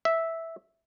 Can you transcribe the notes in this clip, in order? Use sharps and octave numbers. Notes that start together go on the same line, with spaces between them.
E5